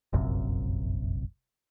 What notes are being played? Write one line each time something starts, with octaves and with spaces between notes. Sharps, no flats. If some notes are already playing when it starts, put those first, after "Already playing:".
F1 A#1 F#2 C3